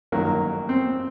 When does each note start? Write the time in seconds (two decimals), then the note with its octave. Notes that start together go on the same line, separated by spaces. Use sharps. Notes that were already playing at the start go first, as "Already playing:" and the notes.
0.12 A1 G2 D#3 F#3 A#3
0.69 C4